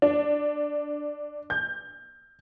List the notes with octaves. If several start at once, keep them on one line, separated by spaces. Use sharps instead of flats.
D4
G6